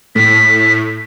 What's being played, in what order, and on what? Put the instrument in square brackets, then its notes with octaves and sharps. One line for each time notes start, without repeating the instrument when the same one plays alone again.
[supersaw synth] A2 [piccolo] B6